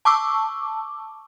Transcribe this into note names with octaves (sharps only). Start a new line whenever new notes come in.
A5 C#6 D6 E6